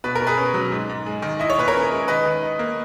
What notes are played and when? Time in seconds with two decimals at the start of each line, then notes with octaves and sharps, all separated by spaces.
0.04 B2 B4
0.15 B2 A#4
0.27 G#4 B4
0.38 C#4
0.54 F#3
0.72 G#2
0.89 G#2
1.06 G#3
1.22 D#3
1.40 E4 D#5
1.50 C#5
1.58 A#2 B4
1.68 A#4 C#5
1.75 C#4
1.91 G#3
2.08 D#3 B4 D#5
2.25 D#3
2.43 D#4
2.59 A#3